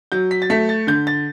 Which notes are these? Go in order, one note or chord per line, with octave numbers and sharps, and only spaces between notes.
F#3 G6
B6
A6
A3 B6
A6
D3 G6
A6